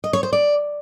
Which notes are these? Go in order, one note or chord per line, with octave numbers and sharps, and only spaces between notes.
D#5
C#5
C5
D5